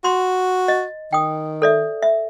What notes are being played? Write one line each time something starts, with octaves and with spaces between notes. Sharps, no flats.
F#4 C6
D#5
D#3 G5 D#6
A4 D5 E5
E5